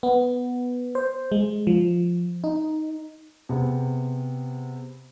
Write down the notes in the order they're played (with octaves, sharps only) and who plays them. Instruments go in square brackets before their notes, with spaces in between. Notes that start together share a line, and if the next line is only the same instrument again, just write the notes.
[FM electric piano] B3
C5
G#3
F3
D#4
[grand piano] C3 B3 G#4